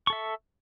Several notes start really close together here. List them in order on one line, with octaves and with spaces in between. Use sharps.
C#6 A4 E5